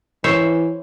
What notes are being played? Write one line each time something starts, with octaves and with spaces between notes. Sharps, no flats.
E3 C5 C#5 E5